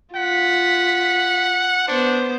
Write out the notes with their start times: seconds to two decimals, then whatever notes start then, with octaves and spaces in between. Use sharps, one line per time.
0.15 F4 F#5 B6
1.88 B3 D4 C5